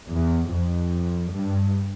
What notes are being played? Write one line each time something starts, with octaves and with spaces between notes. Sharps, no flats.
E2
F2
G2